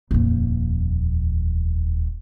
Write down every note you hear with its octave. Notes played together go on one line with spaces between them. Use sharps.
D#1 F2